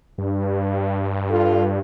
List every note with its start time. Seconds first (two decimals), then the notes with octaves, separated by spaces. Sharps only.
0.18 G2
1.30 F4 A4